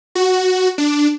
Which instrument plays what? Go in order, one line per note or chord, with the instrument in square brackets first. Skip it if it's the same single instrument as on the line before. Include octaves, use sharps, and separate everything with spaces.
[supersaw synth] F#4
D4